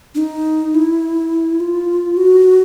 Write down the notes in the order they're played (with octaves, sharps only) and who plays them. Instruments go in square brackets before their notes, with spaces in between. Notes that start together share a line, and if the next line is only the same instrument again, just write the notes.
[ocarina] D4
D#4
E4
F4
F#4